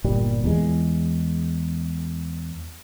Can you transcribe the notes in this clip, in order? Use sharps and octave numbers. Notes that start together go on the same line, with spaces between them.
G1 A#2 G3
E2 G#3